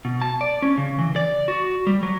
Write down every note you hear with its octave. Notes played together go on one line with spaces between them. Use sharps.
B2
A5
D5
C#4
C#3
E3
D5
F#4
G3
F#3